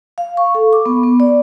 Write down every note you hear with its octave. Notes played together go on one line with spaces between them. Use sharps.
F5
C#6
A4
D6
B3
B3
D5